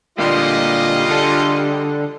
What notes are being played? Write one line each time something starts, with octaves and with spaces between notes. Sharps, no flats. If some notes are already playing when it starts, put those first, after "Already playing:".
A#2 D3 G3 A#3 F4 G#4 D5 D#5
D3 A4